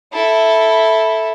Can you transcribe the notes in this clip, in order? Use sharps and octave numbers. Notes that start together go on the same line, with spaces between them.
E4 A4